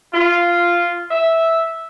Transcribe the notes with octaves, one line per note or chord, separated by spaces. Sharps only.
F4
E5